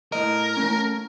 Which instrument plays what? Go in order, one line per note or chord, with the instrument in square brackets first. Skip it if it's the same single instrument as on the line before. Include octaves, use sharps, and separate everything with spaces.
[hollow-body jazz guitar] A2 D#5 [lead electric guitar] A#4
[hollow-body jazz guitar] A3 C#4